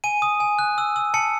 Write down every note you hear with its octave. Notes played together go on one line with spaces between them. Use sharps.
G#5 D#7
D#6
G#5
F#6
E6
E6
A5 C#7